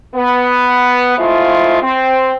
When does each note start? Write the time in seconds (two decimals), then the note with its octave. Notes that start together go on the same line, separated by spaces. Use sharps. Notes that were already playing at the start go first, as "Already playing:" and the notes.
0.15 B3
1.18 G#3 A3 C4 E4 F4
1.82 C4